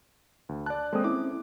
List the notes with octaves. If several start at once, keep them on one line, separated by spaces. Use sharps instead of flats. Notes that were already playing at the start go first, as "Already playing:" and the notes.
D2
D5 A5 F#6
G#3 A#3 C4 A4 C5 D#6
C4 C#4 E4 D6